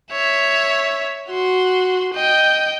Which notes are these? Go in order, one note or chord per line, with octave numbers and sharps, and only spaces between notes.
C#5 E5
F#4 C6
D#5 G5